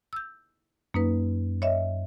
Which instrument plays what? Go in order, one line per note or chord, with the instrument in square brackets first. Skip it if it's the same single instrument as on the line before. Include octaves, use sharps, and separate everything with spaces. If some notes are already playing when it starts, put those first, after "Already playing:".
[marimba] E6 G6
[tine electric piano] F#2 [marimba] A#3 D#4 B4
[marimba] C#5 D#5 E5